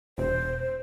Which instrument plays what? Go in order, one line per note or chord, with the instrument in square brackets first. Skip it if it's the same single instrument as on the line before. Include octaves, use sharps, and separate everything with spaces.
[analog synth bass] E1 [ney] C5